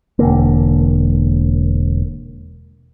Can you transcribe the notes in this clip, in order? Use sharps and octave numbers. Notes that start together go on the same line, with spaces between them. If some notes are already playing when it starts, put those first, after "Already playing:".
E1 D3 A#3